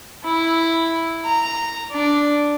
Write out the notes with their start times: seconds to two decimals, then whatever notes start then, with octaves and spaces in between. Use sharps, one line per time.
0.24 E4
1.26 A#5
1.91 D4